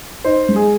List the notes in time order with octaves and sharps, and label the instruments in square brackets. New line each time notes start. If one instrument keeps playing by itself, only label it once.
[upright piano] D#4 [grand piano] C5
[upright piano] G#3
[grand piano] G#4